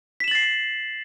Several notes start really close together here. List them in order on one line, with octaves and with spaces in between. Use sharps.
B6 E7 F#7 A6 C7